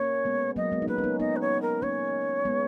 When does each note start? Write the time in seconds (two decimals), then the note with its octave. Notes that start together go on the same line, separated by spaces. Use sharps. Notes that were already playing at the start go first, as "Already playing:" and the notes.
Already playing: A#3 C#4 C#5
0.25 G#3 B3
0.56 F#3 A#3 D#5
0.72 G#3 B3
0.82 D#4
0.88 A#3 C#4 B4
0.98 C#4
1.04 B3 D#4
1.20 B3 D#4 D#5
1.36 B4
1.41 C#5
1.62 A#4
1.82 A#3 C#4 C#5
2.45 G#3 B3